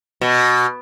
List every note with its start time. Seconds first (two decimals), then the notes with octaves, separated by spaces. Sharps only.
0.21 B2